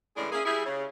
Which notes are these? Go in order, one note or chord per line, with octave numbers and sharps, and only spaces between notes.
A2 C#3 E3 G#3 D4 G#4
A#3 C#4 E4 G#4
G3 E4 G#4
C#3